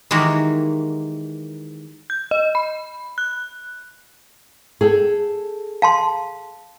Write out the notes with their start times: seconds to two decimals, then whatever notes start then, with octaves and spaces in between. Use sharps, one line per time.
0.11 D#3 E3 G#3 A#3 F#4 G4
2.10 G6
2.31 D#5
2.55 B5
3.18 F#6
4.81 G#4 A4 G5
5.82 F5 A5 C6